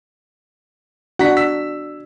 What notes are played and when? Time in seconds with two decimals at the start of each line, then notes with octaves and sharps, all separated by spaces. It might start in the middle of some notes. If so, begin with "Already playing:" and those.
1.19 D4 F#4 F#5 A#5 B6
1.37 E6 B6